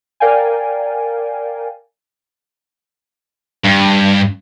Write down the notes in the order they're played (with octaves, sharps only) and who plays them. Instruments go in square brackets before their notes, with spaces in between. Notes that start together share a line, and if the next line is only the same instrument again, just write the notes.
[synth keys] A#4 D5 F5 G5 G#5
[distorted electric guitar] G2